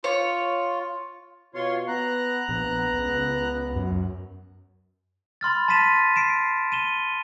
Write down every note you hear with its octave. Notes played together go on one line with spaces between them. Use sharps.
F4 C#5
B2 F4 C#5 C6
B3 A#5 F#6
A#1 B3
C#2
F#2
B5 C6 F6 A6
A5 C6 A6 B6 D#7 E7
C7 D7 E7
D#7 E7 G7